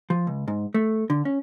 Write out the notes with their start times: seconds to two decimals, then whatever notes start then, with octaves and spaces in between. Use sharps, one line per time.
0.10 F3
0.27 C#2
0.48 G#2
0.74 A3
1.10 D3
1.25 C#4